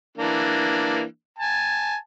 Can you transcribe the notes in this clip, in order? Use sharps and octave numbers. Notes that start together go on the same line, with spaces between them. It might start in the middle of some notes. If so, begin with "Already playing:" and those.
E3 A#3 D4
G#5 A5